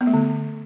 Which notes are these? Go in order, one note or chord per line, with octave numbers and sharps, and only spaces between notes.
B3
A3
D3